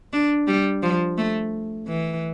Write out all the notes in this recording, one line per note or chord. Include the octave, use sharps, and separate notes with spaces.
D4
G3
F3
A3
E3